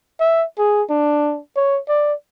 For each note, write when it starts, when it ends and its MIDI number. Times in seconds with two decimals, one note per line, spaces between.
0.20 0.45 76
0.58 0.83 68
0.90 1.40 62
1.56 1.79 73
1.88 2.13 74